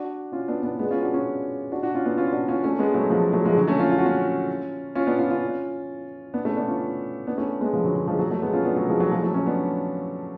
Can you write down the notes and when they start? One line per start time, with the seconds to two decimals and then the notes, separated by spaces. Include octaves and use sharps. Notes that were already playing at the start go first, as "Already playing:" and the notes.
Already playing: D4 F#4
0.32 C#4 F4
0.48 B3 D4
0.63 B3 D4
0.79 G#3 B3
0.91 C#4 F4
1.03 D4 F#4
1.14 C#4 F4
1.72 D4 F#4
1.82 D4 F#4
1.94 C#4 F4
2.06 B3 D4
2.17 C#4 F4
2.28 F4
2.33 D4 F#4
2.48 C#4 F4
2.64 A3 C#4
2.79 G#3 B3
2.94 F#3 A3
3.10 F3 G#3
3.33 F#3 A3
3.46 F3 G#3
3.57 D3 F#3
3.68 A3 C#4
3.79 C#4 F4
3.92 F4
3.98 F#4
4.06 C#4 F4
4.95 C#4 F4
5.07 B3 D4
5.19 C#4 F4
5.31 C#4 F4
6.34 B3 D4
6.45 A3 C#4
6.57 B3 D4
6.68 C#4 F4
7.27 B3 D4
7.38 A3 C#4
7.61 G#3 B3
7.73 F3 G#3
7.84 D3 F#3
7.95 D3 F#3
8.07 F3 G#3
8.19 F#3 A3
8.31 F#3 A3
8.42 G#3 B3
8.53 C#4 F4
8.65 B3 D4
8.76 F#3 A3
8.89 F3 G#3
9.00 F#3 A3
9.11 F3 G#3
9.23 F#3 A3
9.34 A3 C#4
9.47 B3 D4